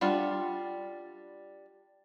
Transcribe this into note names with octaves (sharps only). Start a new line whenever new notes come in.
G3 D4 F4 F#5